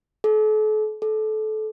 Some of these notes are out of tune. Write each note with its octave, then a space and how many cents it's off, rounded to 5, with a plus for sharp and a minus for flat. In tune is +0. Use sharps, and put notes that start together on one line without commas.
A4 -40
A4 -25